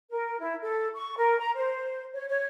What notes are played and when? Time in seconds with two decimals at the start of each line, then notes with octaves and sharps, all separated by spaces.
0.09 A#4
0.40 E4
0.62 A4
0.95 C#6
1.17 A#4
1.38 A#5
1.56 C5
2.13 C#5
2.28 C#5